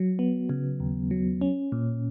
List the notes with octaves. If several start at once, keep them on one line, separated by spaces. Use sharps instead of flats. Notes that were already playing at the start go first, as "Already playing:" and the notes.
Already playing: F#3
B3
C#3
D#2
F#3
C#4
A#2